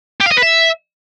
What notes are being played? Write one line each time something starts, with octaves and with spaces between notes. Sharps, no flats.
G4
F5
D#5
B4
E5